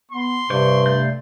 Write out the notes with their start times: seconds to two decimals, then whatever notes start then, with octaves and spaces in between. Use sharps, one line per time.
0.12 B3 C6
0.50 G2 C3 C5 D5 C#6
0.86 A3 D5 G6